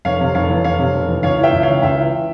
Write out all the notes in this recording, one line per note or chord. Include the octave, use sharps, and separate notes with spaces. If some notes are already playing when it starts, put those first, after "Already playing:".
F1 C#5 F5
C3
F1 C#5 F5
E2
F1 C#5 F5
C3
F1
E2
C#2 C#5 F5
E3
E5 G5
C#2
C#3 C#5 F5
C#2 E5 G5
E3